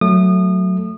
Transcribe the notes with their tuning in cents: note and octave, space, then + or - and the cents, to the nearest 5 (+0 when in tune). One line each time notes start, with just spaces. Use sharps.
F#3 +0 A3 +0 D#6 -30